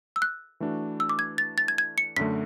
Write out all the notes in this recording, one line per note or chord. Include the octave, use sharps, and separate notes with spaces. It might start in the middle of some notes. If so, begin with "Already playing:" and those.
E6
F#6
E3 A3 D4 F#4
E6
D6
G#6
A6
A6
G#6
G#6
C#7
F#2 D3 A3 B6